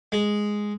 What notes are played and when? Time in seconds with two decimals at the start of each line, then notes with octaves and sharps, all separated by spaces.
0.12 G#3